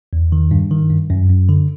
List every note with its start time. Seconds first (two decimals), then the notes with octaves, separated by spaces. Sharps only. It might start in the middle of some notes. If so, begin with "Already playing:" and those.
0.13 E2
0.32 D#3
0.51 G2
0.71 D#3
0.90 G2
1.10 F#2
1.30 F#2
1.49 D3